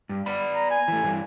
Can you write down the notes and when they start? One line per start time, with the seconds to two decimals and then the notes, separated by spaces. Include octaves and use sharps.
0.09 G2
0.26 B3 D5 B5
0.54 A#5
0.70 G#5
0.88 E3 A3
1.03 G2 E3